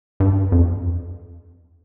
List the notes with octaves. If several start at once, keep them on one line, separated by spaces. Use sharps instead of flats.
G2
F2